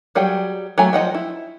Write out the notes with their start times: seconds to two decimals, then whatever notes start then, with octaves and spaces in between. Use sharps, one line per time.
0.15 F#3 G3 G#4 F#5 G5
0.78 F#3 A3 G5 G#5 A#5
0.93 F3 D#5 F#5 G5
1.15 E4